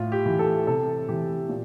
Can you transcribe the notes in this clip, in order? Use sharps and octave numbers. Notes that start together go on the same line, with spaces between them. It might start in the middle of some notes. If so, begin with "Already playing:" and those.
Already playing: A2 F4
G4
E3
A4
C3 A4
E3 G4
A#2